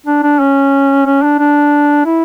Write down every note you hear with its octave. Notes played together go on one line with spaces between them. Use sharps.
D4
D4
C#4
C#4
D4
D4
E4